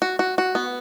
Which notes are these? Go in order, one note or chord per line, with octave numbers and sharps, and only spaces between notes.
F#4
F#4
F#4
B3